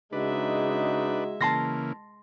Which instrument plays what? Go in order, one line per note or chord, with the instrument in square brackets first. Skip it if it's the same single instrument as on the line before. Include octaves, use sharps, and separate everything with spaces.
[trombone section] C#3 D#4 F#4 [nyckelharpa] G#3 E5 [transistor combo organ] D4 B4
[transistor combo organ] C#3 E3 A#3 [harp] A5 C6 A#6